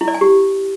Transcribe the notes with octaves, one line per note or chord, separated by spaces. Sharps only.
E4
D5
G#5
G4